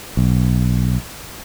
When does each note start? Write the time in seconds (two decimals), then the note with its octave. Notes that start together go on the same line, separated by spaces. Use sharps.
0.17 B1